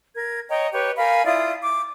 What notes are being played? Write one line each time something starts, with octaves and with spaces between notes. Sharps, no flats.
A#4 G#6
C#5 D#5 G5 A#5
G4 B4 C#5
A#4 F5 G#5 B5
E4 F4 D5 D#6
D6